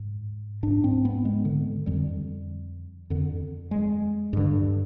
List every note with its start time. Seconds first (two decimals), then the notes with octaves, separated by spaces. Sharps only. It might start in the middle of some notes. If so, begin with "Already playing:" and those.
Already playing: G#2
0.63 G#2 D4
0.84 C4
1.05 B3
1.25 G#3
1.45 D3
1.86 F2 D3 G3
3.10 F2 D3
3.71 G#3
4.33 G2 D3